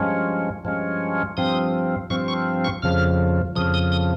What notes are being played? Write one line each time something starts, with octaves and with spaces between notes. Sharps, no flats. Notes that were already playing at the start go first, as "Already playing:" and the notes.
Already playing: G2 F3 G#3 C#4
G2 F3 G#3 C#4
G2 F3 C4 D#6
G2 F3 C4 C#6
C#6
C#6
F2 C#3 F3 F6
F2 C#3 F3 D#6
D#6
D#6